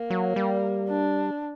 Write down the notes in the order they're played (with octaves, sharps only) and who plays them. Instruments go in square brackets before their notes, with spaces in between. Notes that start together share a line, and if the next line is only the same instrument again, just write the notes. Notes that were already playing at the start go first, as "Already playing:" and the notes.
Already playing: [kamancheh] A#3
[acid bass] F#3
G3
[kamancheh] D4